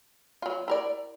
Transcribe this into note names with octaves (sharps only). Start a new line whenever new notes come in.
F#3 F4
E4 A#4 D5